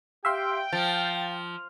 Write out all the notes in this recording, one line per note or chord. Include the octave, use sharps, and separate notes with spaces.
G4 E5 F5 G5 C6
F3 F5 A6